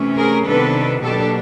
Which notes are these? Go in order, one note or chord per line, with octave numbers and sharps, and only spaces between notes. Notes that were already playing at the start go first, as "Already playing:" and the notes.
Already playing: C3 E3 A3 C#4
G#4 A#4
C3 D#3 G3 B3 D4 A4 B4
B2 F#3 A#3 D4 G4 A4